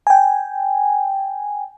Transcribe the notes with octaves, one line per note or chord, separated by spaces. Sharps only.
G5 G#5